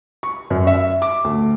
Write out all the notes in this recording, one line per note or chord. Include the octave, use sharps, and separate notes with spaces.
C#6
F#2
E5
D6
D2